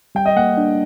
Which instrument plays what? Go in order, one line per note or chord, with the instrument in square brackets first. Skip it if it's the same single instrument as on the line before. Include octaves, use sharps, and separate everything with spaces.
[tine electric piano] G3 [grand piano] G5
[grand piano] D#5
[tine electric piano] A#3 [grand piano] F#5
[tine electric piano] D4